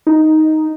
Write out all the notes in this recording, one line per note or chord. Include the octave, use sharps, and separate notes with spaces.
D#4